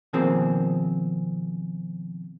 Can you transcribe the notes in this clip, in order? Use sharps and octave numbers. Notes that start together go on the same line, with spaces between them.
B2 D#3 F3 A#3 C4 G#4